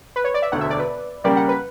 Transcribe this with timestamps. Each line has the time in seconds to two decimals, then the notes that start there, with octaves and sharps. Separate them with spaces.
0.16 B4
0.24 C#5
0.34 D5
0.42 E5
0.52 E1 D2 D3 F#5
0.61 E5
0.70 D5
0.79 B4
1.24 C#3 G3 A#3 C#4 G4 D5
1.36 F#5
1.48 B4